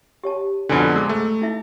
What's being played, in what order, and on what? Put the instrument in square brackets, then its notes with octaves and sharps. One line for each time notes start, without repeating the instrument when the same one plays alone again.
[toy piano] G4 C#5 A5
[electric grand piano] F2 B2 D3 [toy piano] D#4 G#5
[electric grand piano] G#3 [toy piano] A#5 D6 E6
[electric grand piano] A3
[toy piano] D#4 E4 E5